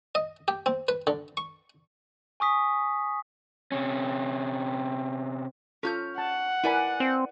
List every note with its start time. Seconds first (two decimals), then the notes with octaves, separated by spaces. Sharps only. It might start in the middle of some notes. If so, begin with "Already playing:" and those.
0.15 D#5
0.48 G4
0.66 C4
0.88 B4
1.07 D3
1.37 C#6
2.40 G#5 C#6 D#6 B6
3.72 C3 C#4
5.83 C#4 F4 A4 F6 G6
6.18 F#5 A5
6.64 E4 A#4 B4 D5 G#5 B5
7.00 C4